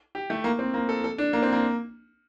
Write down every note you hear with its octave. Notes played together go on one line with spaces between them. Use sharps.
G4
A3
A#3
C4
A#3
A4
A4
D4
A#3
C4
A#3